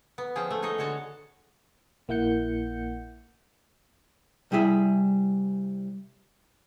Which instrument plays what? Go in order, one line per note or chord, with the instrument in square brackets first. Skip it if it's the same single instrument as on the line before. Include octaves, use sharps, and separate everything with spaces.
[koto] B3
F3 C#4 G#4 G5
A3
D#4 G#4 C#5 D#5
D3 G#3 F#4 C#5 A5
[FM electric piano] A#1 A#3 E4 F#5 G6 C#7
[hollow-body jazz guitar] C2 G3 E4 G#4 E5